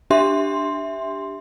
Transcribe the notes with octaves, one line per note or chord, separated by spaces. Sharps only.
D4 G4 E5 C6